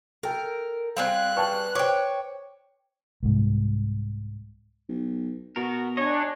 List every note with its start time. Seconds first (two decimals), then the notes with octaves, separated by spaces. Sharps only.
0.23 A4 A#4 G5
0.97 G3 C4 G#4 D5 F5 F#6
1.37 B4 D5 G5 A5 C#6
1.75 C5 C#5 G5 D6
3.23 C2 G#2
4.89 B1
5.56 B2 B3 F#4 A#4
5.97 D4 C#5 D#5 G#5